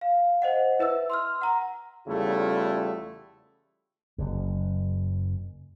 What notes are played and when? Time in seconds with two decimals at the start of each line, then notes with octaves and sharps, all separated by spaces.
0.01 F5
0.42 C5 D#5 F#5
0.79 E4 B4 E5 E6
1.10 C6 E6 F6
1.42 F#5 A#5
2.08 E2 C#3 G3 A3 E4 F4
4.18 F#1 F#2